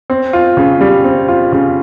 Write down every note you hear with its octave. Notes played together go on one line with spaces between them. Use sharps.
C4
F4
C#3
G3
C4
F4
C#3